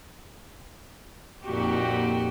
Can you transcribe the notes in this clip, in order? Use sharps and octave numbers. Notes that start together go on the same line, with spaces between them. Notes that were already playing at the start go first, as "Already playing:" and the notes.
F2 A#2 D#4 F#4 G4